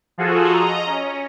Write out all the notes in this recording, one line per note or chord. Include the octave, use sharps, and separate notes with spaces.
F3 F4 F#4 G#4 A4
D#5 A#5
C#4